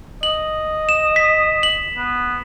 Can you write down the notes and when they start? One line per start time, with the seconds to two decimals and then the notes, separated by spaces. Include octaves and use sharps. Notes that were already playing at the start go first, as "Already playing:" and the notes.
0.23 D#5 F#7
0.89 E7
1.16 B6
1.63 F#7
1.97 B3